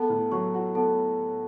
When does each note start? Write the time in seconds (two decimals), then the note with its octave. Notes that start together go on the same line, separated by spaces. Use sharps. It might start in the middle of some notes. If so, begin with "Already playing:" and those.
Already playing: B3 A4 A5
0.10 A2
0.32 F#3 C#5 C#6
0.54 F#4
0.75 B3 A4 A5